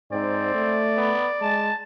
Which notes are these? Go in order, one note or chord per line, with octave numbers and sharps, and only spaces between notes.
G#2 C4 D5
A3
B3
G#3 A5